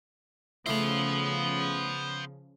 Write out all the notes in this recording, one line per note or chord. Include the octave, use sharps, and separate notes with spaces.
C#3 F3 A3 B3 E4 C5 F5